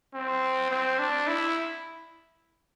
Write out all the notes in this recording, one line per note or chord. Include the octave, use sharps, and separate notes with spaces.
C4
C4
D4
E4